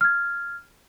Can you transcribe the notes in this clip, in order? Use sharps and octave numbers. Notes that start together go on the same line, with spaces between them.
F6 G#6